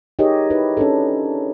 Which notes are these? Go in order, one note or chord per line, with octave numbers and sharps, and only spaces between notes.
D#4 G4 G#4 A#4 C#5 D#5
D#4 E4 B4
C#4 D4 A4